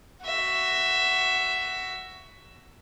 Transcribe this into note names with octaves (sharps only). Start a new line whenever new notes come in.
F#4 E5